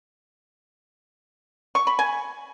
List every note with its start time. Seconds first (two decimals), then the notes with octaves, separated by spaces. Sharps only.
1.75 C#6
1.87 B5
1.99 G#5